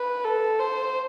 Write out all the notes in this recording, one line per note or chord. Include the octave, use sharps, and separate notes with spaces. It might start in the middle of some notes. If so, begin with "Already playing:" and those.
Already playing: B4
A4
C5